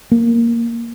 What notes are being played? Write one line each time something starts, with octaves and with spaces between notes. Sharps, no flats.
A#3